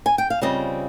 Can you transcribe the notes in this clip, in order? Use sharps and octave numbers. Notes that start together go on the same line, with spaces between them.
G#5
G5
F5
C#3 G3 C4 F4 D#5